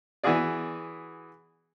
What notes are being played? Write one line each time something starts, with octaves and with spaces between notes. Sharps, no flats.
E3 B3 F#4 G#4 D5